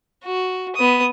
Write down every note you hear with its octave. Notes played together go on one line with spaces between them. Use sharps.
F#4
B3 D#6